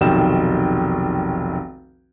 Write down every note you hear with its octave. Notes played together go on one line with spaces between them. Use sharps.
F1 B1 D#3 G5 E7